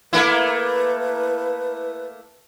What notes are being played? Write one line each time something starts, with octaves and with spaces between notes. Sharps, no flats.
A3 A#3 E4 B4